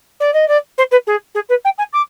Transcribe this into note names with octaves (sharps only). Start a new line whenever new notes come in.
D5
D#5
D5
C5
B4
G#4
G#4
B4
G5
G#5
D6